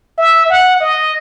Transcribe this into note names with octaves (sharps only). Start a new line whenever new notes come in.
E5
F#5
D#5